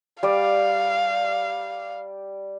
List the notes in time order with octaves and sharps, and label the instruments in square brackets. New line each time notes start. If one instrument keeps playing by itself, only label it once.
[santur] G3 D5 [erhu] F5